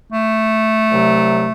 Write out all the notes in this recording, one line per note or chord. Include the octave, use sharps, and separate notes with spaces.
A3
C2 C3 F#3